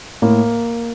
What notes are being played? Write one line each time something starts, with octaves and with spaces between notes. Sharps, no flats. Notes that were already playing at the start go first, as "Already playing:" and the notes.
A2 A#3